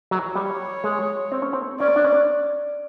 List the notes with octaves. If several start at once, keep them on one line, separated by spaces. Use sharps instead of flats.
F#3
G3 C#5
G#3
C4
C#4
C4
C#4 D5
D4
C#4